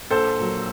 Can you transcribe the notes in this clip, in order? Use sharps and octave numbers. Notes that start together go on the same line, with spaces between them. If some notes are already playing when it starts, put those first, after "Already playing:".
A#1 A4 C5
A#2 F#3